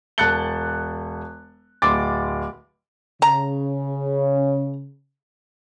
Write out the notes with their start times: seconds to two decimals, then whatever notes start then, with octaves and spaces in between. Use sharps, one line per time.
0.18 E1 A5 F#6 A6 C#7 G7
1.82 D1 C6 D6 A6
3.22 C#3 A#5